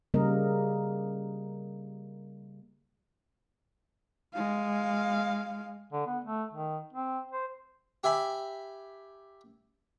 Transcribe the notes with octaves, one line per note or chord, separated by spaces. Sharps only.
C#3 G3 A#3 A#4 D#5
G#3 F5
D3
B3
A3
D#3
C4
C5
G4 E5 G#5 B5